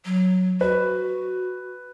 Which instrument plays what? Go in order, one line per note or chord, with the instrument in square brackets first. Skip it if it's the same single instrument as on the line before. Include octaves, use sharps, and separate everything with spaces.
[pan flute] F#3
[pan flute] F#4 [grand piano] B4